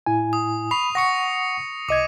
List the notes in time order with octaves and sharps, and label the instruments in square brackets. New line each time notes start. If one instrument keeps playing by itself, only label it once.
[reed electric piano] A2 E4 G#5
[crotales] D#6
[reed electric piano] B5 [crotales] C#6 C7 F7
[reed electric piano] F#5 C#6 [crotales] A#6 C7 C#7
[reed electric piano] C2 D#5 G#6 [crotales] D6 D#7